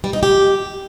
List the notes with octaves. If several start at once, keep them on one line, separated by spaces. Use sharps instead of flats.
G3
D#4
G4